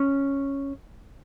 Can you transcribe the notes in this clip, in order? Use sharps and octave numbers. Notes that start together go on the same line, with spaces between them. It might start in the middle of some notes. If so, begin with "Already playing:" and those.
Already playing: C#4